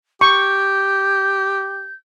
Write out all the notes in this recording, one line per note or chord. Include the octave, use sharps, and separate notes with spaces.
G4 C#6 G6